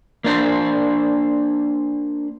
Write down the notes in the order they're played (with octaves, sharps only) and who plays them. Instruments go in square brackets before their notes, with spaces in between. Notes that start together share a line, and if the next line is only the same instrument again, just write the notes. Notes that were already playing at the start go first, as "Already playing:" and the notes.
[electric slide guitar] A#3 D4 C5